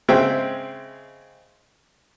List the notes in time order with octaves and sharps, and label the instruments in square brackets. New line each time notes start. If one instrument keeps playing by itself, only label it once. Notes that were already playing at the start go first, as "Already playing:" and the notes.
[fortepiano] C#3 G#3 C4 E5 G5